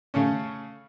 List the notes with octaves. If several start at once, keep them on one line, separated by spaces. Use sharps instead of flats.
C#3 A3 C#4